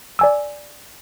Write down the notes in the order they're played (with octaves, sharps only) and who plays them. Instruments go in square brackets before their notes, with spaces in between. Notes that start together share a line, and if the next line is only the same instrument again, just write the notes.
[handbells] D5 G#5 E6